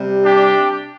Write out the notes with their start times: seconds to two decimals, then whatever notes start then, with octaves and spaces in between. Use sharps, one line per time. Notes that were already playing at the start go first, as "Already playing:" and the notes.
Already playing: C3 G3
0.25 D4 G4